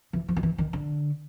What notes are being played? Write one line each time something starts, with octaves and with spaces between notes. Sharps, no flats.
E3
F3
D#3
E3
D#3
D3